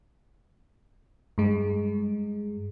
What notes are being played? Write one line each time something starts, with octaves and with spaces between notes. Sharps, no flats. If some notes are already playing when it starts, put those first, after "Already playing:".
G2 G#3